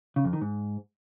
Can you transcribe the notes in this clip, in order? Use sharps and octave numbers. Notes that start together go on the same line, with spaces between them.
C#3
F2
D#3
G#2